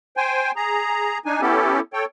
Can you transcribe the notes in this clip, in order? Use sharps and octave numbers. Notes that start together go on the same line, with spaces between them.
C5 G5 G#5
G#4 A#5
D4 D#4 G#5
B3 C#4 E4 G4 A4
A4 C#5 G5